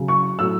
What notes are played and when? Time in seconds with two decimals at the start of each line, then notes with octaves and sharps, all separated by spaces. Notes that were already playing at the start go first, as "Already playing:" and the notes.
Already playing: C#3 F#3
0.08 C#6
0.39 A2 F#3 E6